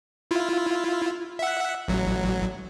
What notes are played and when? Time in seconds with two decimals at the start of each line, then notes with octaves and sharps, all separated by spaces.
0.31 E4 F4
1.39 E5 F#5
1.88 A1 F#3